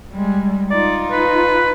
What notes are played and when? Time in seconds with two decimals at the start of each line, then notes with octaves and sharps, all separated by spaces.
0.13 G3 G#3
0.71 D#4 F4 D5
1.11 B4